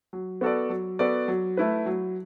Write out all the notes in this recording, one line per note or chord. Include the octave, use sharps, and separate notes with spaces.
F#3
B3 F#4 A4 D5
F#3
B3 F#4 A4 D5
F#3
A3 E4 B4
F#3